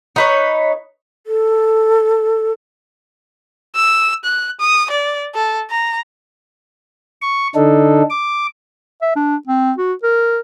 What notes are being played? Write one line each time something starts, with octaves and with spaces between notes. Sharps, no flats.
D#4 B4 C#5
A4
E6
F#6
D#6
D5
A4
A#5
C#6
D3 D4 D#4 A4
D6
E5
D4
C4
F#4
A#4